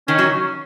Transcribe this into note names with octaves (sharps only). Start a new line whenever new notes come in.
D#3 C#4
F#3